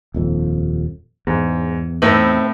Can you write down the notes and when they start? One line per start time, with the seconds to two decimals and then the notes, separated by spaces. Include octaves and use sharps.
0.14 D#1 F2
1.27 E2 G#2
2.02 A2 C4 D#4 B4 E5